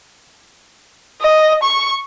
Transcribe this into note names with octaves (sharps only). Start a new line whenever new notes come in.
D#5
C#6